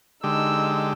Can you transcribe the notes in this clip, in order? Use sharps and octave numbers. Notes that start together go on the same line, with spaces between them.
D3 G#3 D#4 G4 E6